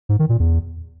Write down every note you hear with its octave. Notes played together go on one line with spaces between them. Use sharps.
G#2
D#3
A#2
E2